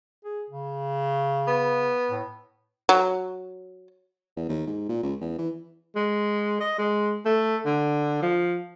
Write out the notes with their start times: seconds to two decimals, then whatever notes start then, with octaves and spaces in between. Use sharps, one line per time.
0.25 G#4
0.50 C#3
1.47 B3
2.11 A2
2.89 F#3
4.37 E2
4.49 D#2
4.67 G#2
4.89 A#2
5.03 C#2
5.21 E2
5.39 E3
5.96 G#3
6.60 D#5
6.78 G#3
7.25 A3
7.66 D3
8.22 F3